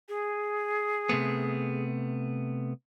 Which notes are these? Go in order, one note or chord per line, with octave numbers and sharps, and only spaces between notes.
G#4
C3 A3 B3